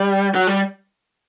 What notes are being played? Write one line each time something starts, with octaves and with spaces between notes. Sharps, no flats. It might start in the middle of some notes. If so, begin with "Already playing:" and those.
Already playing: G3
F#3
G3